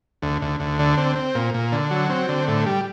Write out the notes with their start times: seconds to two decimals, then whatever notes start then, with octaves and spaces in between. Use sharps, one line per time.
0.22 D2
0.42 D2
0.60 D2
0.79 D3
0.97 C4
1.16 C4
1.35 A#2
1.54 A#2
1.72 D3
1.91 F#3
2.10 C4
2.29 D3
2.48 A2
2.66 G3